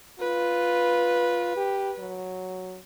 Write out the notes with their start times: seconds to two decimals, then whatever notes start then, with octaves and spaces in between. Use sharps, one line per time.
0.20 F4 B4
1.57 G4
1.99 F#3